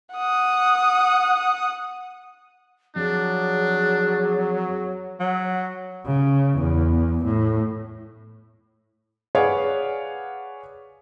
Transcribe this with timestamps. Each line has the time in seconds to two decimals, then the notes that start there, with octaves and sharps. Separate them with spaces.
0.15 F#5 D#6
2.96 F2 F#3 D4 G#4
5.20 F#3
6.06 C#3
6.59 E2
7.25 A2
9.35 G#4 B4 C#5 D5 F5 F#5